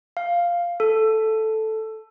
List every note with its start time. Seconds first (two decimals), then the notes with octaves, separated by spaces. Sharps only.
0.17 F5
0.80 A4